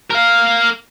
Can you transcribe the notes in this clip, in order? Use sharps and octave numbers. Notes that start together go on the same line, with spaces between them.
A#4 F5